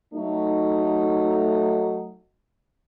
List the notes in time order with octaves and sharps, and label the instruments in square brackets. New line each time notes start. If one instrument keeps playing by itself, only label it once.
[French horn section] F#3 A3 D#4